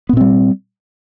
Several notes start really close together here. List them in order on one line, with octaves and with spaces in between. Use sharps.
B3 A#2 C4 G3